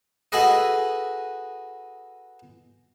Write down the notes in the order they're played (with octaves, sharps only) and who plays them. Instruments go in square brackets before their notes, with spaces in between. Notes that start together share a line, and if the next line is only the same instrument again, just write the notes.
[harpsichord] F#4 G#4 A4 B4 D#5